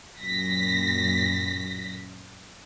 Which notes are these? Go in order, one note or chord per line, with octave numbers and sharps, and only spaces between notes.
F#2 A#2 A#6 B6